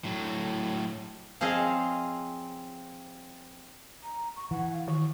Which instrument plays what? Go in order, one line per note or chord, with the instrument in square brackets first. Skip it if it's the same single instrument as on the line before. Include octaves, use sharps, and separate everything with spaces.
[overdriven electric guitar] A2 F#3
[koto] F3 C4 C#4 G#4 D#5 F5
[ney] A#5
C#6
[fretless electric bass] E3 [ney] F#5
[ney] F5
[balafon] D#3 [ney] C#6